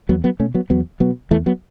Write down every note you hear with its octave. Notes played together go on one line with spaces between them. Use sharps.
E2 F#3 B3
F#3 B3
B2 A3 C#4
F#3 B3
E2 F#3 B3
B2 F#3 B3
E2 E3 A3
F#3 B3